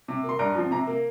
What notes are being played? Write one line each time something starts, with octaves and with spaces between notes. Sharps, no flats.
C3
A#3
C6
G2 A#5
F3 C4
C3 A#5
A#3